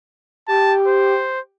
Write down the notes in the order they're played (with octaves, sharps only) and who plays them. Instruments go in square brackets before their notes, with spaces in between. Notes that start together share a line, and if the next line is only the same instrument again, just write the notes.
[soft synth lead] G4 [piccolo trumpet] A5
[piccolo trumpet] C5